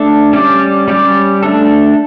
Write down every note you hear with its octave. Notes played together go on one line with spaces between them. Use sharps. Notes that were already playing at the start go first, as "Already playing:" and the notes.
Already playing: A3 D4 A4
G3 C#4 G4 D5
G3 C#4 G4 D5
A3 D4 A4